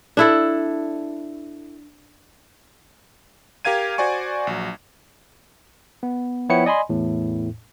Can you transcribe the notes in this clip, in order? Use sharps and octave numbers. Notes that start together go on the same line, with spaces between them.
D4 E4 A4
G4 A#4 F5 G#6 D#7
F#4 C5 D5 G#5 C#6
A#1 F#3
B3
F3 B3 E4 C#5 G5 C#7
D5 D#5 G#5 B5 C6
E2 A2